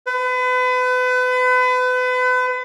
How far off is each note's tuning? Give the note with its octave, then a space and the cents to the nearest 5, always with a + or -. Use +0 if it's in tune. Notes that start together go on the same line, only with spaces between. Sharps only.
B4 +35